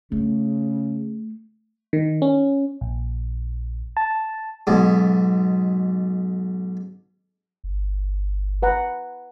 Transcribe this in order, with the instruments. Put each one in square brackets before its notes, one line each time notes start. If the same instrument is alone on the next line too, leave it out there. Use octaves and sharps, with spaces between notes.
[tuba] C#3 [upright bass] A3
[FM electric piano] D#3
C#4
A#1
A5
[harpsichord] B1 G#2
[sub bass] G1
[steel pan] B4 F#5 A#5